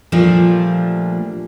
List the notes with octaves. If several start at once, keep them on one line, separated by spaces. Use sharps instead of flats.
A#2 F3 G3 A3 D4